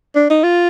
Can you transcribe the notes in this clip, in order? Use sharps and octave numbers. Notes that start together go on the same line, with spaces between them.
D4
D#4
F4